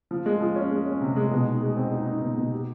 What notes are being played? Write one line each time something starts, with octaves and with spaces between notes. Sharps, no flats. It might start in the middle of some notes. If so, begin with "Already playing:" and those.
F3
G#3
F3
C#4
G#3
C#4
C3
G#3
B2
D#4
G#3
C4
D#4
D#4
B2
B2
G4